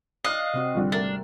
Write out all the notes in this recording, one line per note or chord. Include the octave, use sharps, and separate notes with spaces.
D5 D#5 F5 F6 F#6 C7
C3 C4 F#4
G#1 D3 F3 G3
A3 D4 A#4